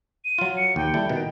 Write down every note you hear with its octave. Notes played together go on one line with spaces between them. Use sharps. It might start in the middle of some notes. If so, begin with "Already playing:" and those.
D#7
F#3 F4
C#7
D#2 G5
G3 E4 A4
B2 D#3